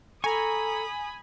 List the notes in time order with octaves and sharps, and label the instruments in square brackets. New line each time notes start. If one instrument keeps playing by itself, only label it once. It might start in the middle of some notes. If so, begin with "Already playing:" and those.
[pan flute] A4 [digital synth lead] G#5 [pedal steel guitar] A#5 C#6 [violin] B5 D#6